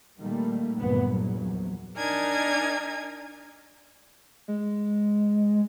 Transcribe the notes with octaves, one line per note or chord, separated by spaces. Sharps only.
A#2 D#3 G3 A3 A#3
F#1 D2 G2 A#2 B3
A#1 E2 F#3
D4 D#4 A#4 G#5 G#6
G#3